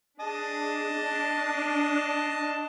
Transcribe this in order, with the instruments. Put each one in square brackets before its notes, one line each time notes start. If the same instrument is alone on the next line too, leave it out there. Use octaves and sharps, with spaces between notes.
[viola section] D4 G#4 [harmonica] D#5 A5
[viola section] D4